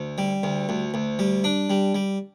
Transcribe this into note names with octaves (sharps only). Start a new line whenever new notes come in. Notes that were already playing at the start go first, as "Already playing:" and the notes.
Already playing: D2
G3
D2
D2
D2
G3
D4
G3
G3